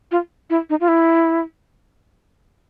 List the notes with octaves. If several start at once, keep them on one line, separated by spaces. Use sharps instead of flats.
F4
E4
D#4
F4
E4